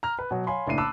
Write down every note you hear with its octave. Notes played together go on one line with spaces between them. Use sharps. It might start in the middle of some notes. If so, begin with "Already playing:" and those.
A#5 F6
B4
B2 F#3
C#5 F5 G#5 B5 C6
F#1 A2 D4 E4 C7 D#7
A5 B5 D6 E6 F#6